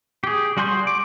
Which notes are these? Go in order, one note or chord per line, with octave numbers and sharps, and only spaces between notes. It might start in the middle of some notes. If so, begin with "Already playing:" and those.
G4 G#4
G3 F#4 G#5 C6 G6
D6